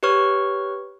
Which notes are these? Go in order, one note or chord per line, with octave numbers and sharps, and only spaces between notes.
G4 B4 C#5 C#6 F6